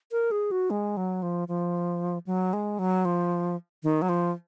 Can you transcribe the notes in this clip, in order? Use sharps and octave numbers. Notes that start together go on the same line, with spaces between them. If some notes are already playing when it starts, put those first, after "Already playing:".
A#4
G#4
F#4
G#3
F#3
F3
F3
F#3
G#3
F#3
F3
D#3
F#3
F3